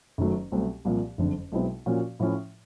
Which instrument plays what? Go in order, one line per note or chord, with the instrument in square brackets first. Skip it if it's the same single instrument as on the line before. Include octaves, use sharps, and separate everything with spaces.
[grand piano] F#1 F#2 D#3 F#3 A3
C2 B2 F#3 A3 C4
C2 A#2 F3 A#3
F#1 F2 D3
B1 B2 G#3 C4 E4
A#2 F3 A#3 C#4 F#4
A2 F3 A3 C#4 E4